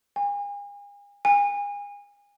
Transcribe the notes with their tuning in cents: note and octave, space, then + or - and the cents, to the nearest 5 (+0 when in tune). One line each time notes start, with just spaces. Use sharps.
G#5 -40
G#5 -35